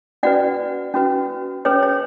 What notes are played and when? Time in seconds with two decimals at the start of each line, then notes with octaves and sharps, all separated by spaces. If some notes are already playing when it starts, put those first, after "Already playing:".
0.23 C#4 F#4 B4 D5 F#5
0.94 C#4 F#4 B4
1.65 C#4 G#4 B4 C#5
1.83 C#5